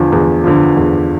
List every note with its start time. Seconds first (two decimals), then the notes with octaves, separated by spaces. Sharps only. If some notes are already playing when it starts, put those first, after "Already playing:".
Already playing: E2 D3 F3
0.12 E2
0.44 D3 F3
0.77 E2